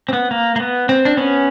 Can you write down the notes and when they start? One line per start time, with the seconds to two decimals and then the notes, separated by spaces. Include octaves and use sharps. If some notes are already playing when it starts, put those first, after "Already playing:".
0.09 C4
0.13 B3
0.31 A#3
0.56 A#3
0.60 B3
0.89 C4
1.05 D4
1.17 B3 C#4